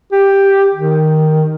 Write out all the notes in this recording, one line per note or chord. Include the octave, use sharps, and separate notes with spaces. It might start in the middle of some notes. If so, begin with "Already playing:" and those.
G4
D#3